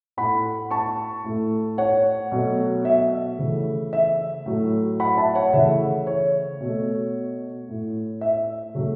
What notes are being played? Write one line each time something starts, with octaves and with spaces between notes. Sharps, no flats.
A2 A3 F#5 B5
A5 C#6
A2 A3
C#5 F#5
B2 F#3 A3
E5
C#3 E3 A3
E5
A2 F#3 A3
F#5 B5
E5 A5
C#5 F#5
C#3 E3 A3 E5
C#5
B2 A3
A2 A3
E5
C#3 F#3 A3